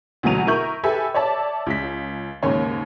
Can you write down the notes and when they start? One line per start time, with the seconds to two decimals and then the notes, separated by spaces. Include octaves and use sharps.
0.23 D2 B2 E3 F#3 D#7 F7
0.47 E4 A#4 C#6 G6 F#7
0.84 G4 A4 B4 E5 G#5
1.14 C#5 D5 E5 A5
1.67 C#2 B6
2.42 D#2 G#2 C#3 C#5 C6